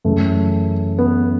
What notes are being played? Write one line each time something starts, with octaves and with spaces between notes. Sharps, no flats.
F#2 C#3 E3 A3
B3